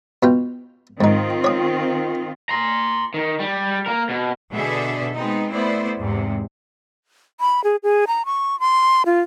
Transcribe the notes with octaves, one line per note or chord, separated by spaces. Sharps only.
B2 F4 G5
G#2 D#3 C4 D#4 F4
C#5 D#6
A#5 C6
D#3
G3
A#3 A#4
B2
B2 D3 D4 G#4 A4 E5
G#3 B3 C4 D#4
A3 B3 E4 C5 D5
E2 G#2 C3
B5
G#4
G#4
A#5
C#6
C6
F4